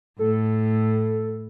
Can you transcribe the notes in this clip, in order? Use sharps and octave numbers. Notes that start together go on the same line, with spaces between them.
A2 A4